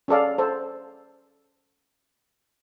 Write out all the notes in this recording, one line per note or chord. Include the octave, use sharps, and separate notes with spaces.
C#4 G#4 A4 D5 F5
A4 C5